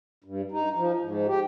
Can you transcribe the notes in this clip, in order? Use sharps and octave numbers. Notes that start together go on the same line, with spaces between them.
G2
D#4
F3
G#2
G4